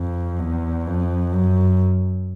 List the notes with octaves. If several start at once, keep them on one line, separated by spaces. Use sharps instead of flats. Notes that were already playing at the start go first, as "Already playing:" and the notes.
Already playing: F2
E2
F2
F#2